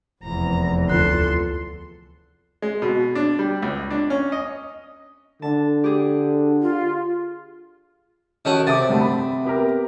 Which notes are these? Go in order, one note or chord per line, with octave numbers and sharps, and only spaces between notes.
F1 E2 A#5
D2 F4 A4 C6 F#6
G#3
B2
D4
G3
C#2
D4
C#4
D#5
D3 A5
G4 G#4
F4
D#3 C#4 F#4 A4
C3 D6 D#6 A6
G2 D3 A3
B5
B3 G4 A#4